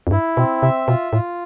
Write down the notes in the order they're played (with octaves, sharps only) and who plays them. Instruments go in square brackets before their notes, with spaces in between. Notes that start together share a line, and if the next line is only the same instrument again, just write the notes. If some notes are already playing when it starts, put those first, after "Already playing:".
[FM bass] F2
[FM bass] G2 [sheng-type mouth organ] E4
[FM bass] B2 [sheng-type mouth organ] C4
[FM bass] C3 [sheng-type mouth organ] E5
[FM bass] B2 [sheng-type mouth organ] F4
[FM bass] A2 [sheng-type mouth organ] F4